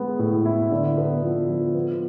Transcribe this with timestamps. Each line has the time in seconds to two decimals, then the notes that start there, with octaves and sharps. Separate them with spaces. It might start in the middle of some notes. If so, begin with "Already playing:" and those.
Already playing: G#3 B3
0.19 A2
0.45 E4
0.71 D3
0.97 B3
1.23 F3
1.49 F3
1.75 B3